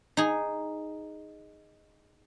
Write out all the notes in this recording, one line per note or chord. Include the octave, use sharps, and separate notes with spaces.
D#4 G#4